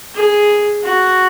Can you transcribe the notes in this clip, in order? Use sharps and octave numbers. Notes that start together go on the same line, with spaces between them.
G#4
F#4